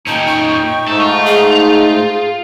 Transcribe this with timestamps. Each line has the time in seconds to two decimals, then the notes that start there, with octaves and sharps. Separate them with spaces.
0.07 A#2 C#4 D#4 G5 A5
0.27 C#6
0.88 G#2 A3 D#4 A4
1.00 F4
1.26 G#4